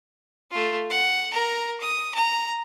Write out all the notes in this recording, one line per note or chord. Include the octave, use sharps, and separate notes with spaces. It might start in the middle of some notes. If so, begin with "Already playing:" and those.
A3 F4
F#5
A#4 A#5
D#6
A#5